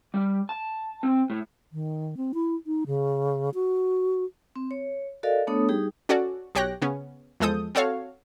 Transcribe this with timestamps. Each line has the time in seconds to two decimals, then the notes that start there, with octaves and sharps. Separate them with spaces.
0.14 G3
0.49 A5
1.03 C4
1.30 A2
1.73 D#3
2.17 C4
2.34 E4
2.66 D#4
2.86 C#3
3.54 F#4
4.56 C4
4.71 C#5
5.23 F#4 A4 A#4 D5 D#5 F5
5.47 A3 B3 D4 A4 C#5 D#6
5.69 G3 D#4 G4 G#4 G5
6.09 C#4 F#4 A4 D5
6.55 B1 G4 C#5 G5 F#6 A#6
6.82 C#3 B3 C#4
7.40 E2 F3 G#3 A4 D#6 G6
7.75 C4 F#4 A4 C#5 F5